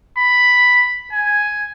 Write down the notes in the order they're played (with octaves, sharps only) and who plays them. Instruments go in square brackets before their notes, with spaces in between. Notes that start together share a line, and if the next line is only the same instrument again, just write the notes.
[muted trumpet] B5
G#5